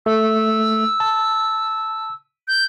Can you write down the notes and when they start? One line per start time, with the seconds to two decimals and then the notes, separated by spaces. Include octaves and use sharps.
0.06 A3 E6
1.00 A5
2.48 G6